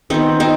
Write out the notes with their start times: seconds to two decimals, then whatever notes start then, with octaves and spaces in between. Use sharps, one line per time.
0.10 D#3 B3 C4 D#4
0.40 C4 D#4